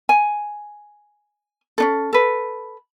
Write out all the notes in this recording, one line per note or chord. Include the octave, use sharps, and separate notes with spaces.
G#5
C#4 D4 A4
A4 B4